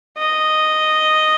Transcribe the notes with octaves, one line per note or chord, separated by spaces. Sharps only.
D#5